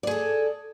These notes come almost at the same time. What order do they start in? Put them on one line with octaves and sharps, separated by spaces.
D5 G#4 A4